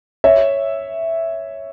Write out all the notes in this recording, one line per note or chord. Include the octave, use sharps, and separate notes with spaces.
C#5 E5